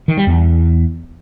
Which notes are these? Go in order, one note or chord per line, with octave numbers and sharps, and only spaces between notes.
D#3
G3
E2